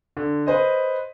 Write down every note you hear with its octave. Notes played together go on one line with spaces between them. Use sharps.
D3
B4 C5 D#5